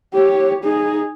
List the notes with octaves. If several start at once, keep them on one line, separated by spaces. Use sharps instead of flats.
G4 C#5
D#4 G#4